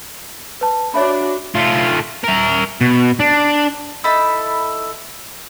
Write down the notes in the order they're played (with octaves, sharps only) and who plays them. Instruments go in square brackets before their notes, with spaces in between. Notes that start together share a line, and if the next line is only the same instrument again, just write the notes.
[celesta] B4 A5
[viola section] D4 F#4 [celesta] C#5 E5 B5
[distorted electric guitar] A3 F4
A#4 E5
B2
D4
[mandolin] D#4 E4 A4 B5